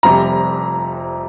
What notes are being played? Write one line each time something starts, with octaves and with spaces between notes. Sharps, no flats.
F1 F2 C3 G3 A#5